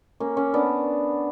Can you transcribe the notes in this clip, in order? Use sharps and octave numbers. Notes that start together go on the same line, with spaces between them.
A#3 C#4
A#3 C#4
B3 D4